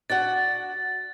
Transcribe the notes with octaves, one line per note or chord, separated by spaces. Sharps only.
D4 F#4 F#5 A6